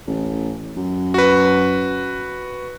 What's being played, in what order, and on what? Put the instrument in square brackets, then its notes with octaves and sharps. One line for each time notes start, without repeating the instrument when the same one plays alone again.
[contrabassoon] A1
F#2
[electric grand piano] F#4 B4